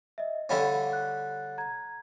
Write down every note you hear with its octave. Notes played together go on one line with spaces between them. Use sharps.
D#5 E5
D3 G3 C#4 F5 F#5 B5
F#6
A#5 G#6